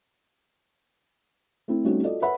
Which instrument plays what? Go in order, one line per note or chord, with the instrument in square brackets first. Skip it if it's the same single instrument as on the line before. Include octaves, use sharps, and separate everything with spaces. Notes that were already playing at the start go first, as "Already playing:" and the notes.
[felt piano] A3 C4 E4
G3 A3 C4 C#4 D#4 F#4
F4 F#4 A4 D5 D#5
A4 B4 C#5 E5 F#5 B5